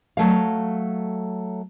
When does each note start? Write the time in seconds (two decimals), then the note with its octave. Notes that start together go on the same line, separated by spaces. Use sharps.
0.17 F#3 A3 F5